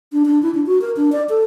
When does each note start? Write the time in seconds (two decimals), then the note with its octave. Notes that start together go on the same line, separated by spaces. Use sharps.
0.13 D4
0.25 D4
0.43 E4
0.54 D4
0.66 F#4
0.81 A#4
0.97 D4
1.12 D5
1.29 A4